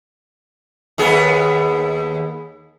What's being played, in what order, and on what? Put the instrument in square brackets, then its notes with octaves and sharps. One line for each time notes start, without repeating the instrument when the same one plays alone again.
[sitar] D#2 B3 G#4